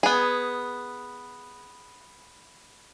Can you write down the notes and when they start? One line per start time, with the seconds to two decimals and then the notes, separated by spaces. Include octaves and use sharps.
0.03 B3 G#4